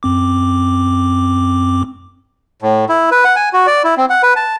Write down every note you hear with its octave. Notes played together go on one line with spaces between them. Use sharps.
F#2 C4 D6
A2
E4
B4
F#5
G#5
F#4
D5
E4
C4
F#5
B4
A5